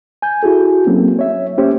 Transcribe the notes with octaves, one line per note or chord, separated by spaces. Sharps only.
G#5 G6
E4 F#4 G#4 A4
F#3 A#3 C4 C#4
C#5 E5
A#3 C#4 G4 C5 C#5 E5